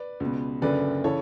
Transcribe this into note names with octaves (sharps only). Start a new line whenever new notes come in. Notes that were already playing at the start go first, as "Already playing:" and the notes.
Already playing: B4 D5
C#2 B2
F#1 F#2 D3 B4 D5
C#3 E3 A4 C#5